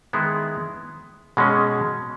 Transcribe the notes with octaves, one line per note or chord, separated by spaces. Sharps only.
D#3 G#3 B3 E4 G#4
B2 G#3 C#4